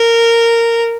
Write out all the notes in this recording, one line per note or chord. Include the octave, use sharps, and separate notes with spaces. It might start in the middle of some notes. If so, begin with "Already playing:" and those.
Already playing: A#4